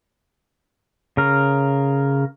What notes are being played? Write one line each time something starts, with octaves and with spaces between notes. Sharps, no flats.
C#3 A#4